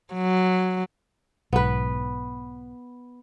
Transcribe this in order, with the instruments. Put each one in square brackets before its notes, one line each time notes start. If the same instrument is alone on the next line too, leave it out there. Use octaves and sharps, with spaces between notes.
[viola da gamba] F#3
[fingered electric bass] B1 G#2 [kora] B3 B4